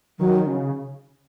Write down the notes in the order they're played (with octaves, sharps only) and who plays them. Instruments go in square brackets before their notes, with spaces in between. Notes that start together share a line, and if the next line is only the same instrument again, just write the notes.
[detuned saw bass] D#3 [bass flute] F#3
[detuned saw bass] C#3